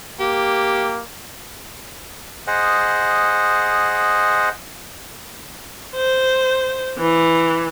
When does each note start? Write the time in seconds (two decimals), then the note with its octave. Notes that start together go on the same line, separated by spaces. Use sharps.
0.20 A#3 G4
2.47 G#4 C5 D#5 F#5
5.96 C5
6.98 E3